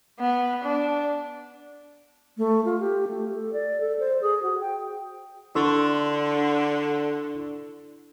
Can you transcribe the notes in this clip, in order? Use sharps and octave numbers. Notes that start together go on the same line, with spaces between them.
B3
D4
A3
F4
G4
A3
A4
D5
A4
C5
G#4
F#4
G5
D3 D4 E4 A4 C6 C#6 E6